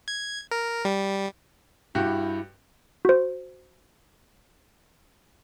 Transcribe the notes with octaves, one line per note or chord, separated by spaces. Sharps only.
G#6
A#4
G3
G2 E4 F#4 G4
F#4 C5